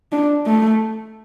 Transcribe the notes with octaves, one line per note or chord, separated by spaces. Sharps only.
D4
A3